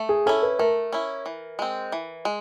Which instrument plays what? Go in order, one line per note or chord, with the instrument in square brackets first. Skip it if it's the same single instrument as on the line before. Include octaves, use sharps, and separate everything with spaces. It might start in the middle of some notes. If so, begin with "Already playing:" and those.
Already playing: [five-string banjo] A3
[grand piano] G#4
[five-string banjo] C#4 E4 [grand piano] A4
[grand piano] B4
[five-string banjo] A3 [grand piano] A#4
[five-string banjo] C#4 E4
E3
G#3 C4
E3
G#3